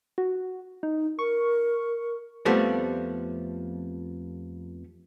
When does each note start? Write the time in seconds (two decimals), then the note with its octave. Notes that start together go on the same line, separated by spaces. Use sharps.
0.18 F#4
0.83 D#4
1.19 A#4 C#6
2.45 F2 F3 G3 A3 B3 C4